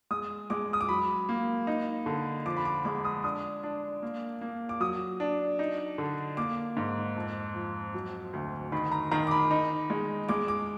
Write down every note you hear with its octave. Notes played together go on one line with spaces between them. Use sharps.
G#3 D#6
G#3 D6
D#6
D6
F#3 B5
A#3
D#4
D3
F3 D6
B5
D6
G#3 D6
D#6
D4 D#6
D4
A#3
A#3
D6
F#3 D#6
D4
D#4
D3
A#3 D6
G#2
F2
F3
F#3
D2
D#3 B5
A#5
D#3 A#5
D6
B5
D#4
G#3
G#3 D6
D6